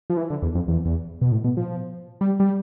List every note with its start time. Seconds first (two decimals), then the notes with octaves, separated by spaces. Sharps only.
0.10 F3
0.17 E3
0.30 D3
0.42 E2
0.55 F2
0.68 E2
0.86 E2
1.22 B2
1.32 A2
1.44 B2
1.57 F3
2.21 G3
2.40 G3